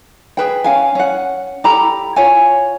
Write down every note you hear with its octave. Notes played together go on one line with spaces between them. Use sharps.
G#4 B4 G5
C#4 F5 G#5
C#4 F#5
G4 A4 A#5 B5
F4 C#5 G#5